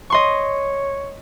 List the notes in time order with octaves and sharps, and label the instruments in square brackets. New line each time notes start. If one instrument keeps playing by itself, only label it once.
[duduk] C#5 [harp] D#5 C6 C#6